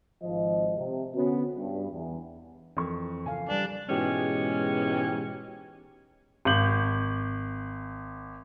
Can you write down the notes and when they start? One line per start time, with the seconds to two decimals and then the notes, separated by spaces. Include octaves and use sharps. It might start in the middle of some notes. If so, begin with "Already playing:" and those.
0.23 G#1 F3 D#5
0.78 C3
1.15 D3 B3 C#4 F#4
1.57 G2
1.91 E2
2.77 F2 E3 F3 A#4 C#6
3.26 C#3 A4 F5 G#5
3.49 G3 D4 B4 D5
3.89 G#2 B2 E3 G#3 C#4 G4
6.45 G#1 G6 F#7